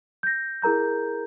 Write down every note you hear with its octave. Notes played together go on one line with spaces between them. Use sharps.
G6 A#6
E4 G#4 A#4 A#5 G6